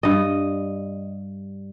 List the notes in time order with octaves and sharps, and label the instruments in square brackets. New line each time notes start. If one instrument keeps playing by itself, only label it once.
[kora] G2 D#5